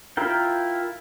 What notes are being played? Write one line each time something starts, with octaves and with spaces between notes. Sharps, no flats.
E4 F4 A#4 G5